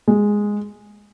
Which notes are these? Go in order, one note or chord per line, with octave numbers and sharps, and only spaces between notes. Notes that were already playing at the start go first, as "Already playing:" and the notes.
G#3